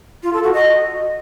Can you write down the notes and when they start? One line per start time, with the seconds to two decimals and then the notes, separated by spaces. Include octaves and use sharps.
0.23 F4
0.33 A4
0.43 F#4
0.53 D#5